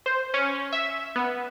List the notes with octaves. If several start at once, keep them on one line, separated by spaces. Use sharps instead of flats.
C5
C#4
E5
B3